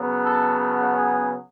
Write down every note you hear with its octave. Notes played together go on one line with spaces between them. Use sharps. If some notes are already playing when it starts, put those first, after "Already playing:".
Already playing: C#3 F#3 B3
A4
A4
G#4